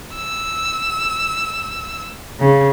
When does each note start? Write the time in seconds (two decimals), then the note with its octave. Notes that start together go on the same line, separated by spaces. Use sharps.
0.16 E6
2.40 C#3